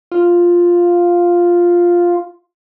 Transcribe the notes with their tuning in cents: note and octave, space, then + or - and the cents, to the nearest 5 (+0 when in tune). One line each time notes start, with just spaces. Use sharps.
F4 +0